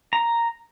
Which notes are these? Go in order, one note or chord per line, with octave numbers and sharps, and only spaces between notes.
A#5